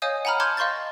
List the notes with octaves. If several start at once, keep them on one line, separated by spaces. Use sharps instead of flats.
C#5 D#5 F5 G#5 D#6 G6
F#5 G#5 A#5 B5 F6
A5 C6 D6 F6 G6 G#6
D#5 F5 C6 C#6 G6 A6